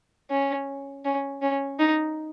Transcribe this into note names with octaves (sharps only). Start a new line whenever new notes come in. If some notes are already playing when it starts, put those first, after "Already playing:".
C#4
C#4
C#4
D#4